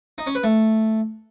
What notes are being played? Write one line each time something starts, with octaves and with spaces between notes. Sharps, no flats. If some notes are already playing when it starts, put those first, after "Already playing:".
D#4
C#4
B4
A3